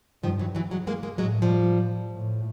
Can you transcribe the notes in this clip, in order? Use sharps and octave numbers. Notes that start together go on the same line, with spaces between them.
G2 D#3 F3
E3 F#3
E3 F#3
F#3 G#3
G#3 A#3
G#3 A#3
A2 F#3 G#3
F3 G3
A2